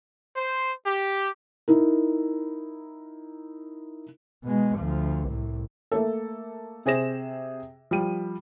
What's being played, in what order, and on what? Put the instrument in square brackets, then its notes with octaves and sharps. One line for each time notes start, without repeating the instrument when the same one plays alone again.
[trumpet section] C5
G4
[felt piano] D#4 E4 A#4
[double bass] B2 G#3
D2 F3
C2 A2
[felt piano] A3 A#3 A4
C3 G#4 C5 A#6 E7
F3 G3 D#7